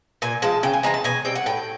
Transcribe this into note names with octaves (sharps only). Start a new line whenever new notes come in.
A#2 G#5
F3 G#3 A5
C#3 G5
G#5
E3 G#3 C4 A#5
A5
B2 G#5
G3 C4 G5
F#5
A2 G5